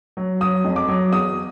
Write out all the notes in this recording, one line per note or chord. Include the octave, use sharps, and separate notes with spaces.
F#3
F#3 D#6
F2
D6
F#3
E2 D#6